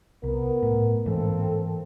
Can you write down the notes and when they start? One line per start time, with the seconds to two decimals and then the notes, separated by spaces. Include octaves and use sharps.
0.23 C2 B3 A#4
0.63 A2
1.06 G#2 E3 A#3 C4 A4